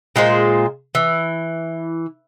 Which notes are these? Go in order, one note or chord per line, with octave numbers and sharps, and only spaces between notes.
A#2 G#3 F4 C5
E3